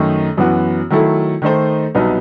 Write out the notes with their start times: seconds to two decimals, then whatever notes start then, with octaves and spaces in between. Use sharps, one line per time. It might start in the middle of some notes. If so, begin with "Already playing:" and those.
Already playing: F#2 D#3 A3 D#4
0.37 F#2 E3 B3 F#4
0.90 D#3 F#3 A3 E4 A4
1.42 D#3 A3 D#4 A4 C5
1.95 C2 B2 F#3 B3 D#4